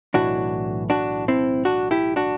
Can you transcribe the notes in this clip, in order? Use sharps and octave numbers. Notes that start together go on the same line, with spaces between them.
B1 A2 E3 D4 F#4
D4 F#4
C4 E4
D4 F#4
E4 G4
D4 F#4